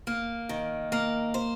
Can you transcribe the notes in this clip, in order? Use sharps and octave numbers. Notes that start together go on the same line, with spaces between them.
A#3
D#3
A#3
C5